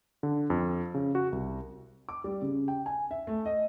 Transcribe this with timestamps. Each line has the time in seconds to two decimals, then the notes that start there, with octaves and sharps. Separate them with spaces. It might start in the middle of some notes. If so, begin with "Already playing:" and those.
0.23 D3
0.50 F2
0.94 C#3
1.15 F#4
1.32 C2
2.09 D6
2.24 G3
2.42 C#3
2.68 G5
2.86 G#5
3.11 E5
3.27 A3
3.46 D#5